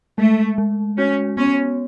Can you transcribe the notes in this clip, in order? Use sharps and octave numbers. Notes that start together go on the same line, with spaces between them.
G#3 A3
G#3
C#4 F#4
B3 C#4